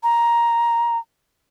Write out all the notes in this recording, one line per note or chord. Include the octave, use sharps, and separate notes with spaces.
A#5